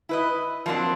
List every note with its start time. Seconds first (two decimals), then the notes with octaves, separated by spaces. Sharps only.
0.09 E4 B4 D#5
0.66 F3 F#3 A#3 C4 D4